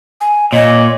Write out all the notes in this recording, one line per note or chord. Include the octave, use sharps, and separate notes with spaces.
G#5
A#2 C#5 D#5